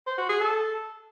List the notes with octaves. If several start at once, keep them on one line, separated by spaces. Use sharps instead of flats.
C5
F#4
G#4
A4